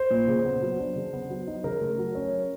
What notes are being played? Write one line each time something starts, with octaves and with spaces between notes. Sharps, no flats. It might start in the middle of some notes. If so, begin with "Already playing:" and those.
Already playing: C5
A#2
C#3
B3
F#3
D4
C#3
B3
F#3
D#4
C#3 A#4
A3
F#3
C#4